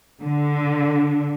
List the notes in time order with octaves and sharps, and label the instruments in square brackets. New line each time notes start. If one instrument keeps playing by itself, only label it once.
[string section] D3